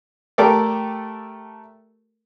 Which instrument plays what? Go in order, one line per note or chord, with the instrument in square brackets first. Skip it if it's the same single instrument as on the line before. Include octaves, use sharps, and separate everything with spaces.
[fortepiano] A3 G4 A4 A#4 D5